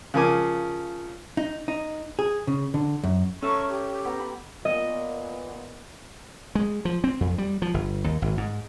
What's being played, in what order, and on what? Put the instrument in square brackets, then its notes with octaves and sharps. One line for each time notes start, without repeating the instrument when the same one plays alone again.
[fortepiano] C#3 F3 A#4 G#5 D6
[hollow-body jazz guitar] D#4
D#4
G#4
C#3
D3
F#2
[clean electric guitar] C#4 E5 [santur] A4 A#5 [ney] C#6
[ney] G4
[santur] B3 A#5
G5 B5
[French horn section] A#2 B3 [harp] D#5
[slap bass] G#3
F3
C4
F2
G3
F3
G1
D#2
G#1
G#2